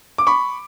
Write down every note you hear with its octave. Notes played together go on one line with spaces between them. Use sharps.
D6
B5 C#6